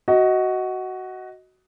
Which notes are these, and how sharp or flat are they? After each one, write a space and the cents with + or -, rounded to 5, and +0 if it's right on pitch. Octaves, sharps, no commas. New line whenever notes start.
F#4 +10 D#5 +15